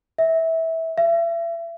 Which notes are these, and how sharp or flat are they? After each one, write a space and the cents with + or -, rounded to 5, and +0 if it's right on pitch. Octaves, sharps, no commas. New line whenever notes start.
E5 -20
E5 +35